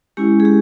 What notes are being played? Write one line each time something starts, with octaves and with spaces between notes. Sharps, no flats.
G#3 C#4 E4 G4
G#4
G4